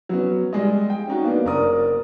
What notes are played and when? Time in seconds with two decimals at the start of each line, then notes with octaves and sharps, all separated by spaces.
0.09 F#3 B3 C#4
0.53 G3 G#3 G#4 D5 D#5
0.90 G5
1.08 C#4 D#4 F#4
1.24 A#3 B3 D4
1.45 F#1 C#4 A#4 D5 D#6